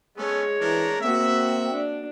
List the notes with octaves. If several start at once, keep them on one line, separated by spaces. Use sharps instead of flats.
G#3 B3 C#4 A4 C#5
E3 D4 A#4
A#3 C4 F#4 E5
D4